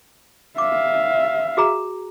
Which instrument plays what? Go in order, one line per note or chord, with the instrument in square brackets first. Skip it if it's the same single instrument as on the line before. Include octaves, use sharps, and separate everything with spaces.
[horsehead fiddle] E5 F5 [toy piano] D6
[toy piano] F#4 G#4 A#5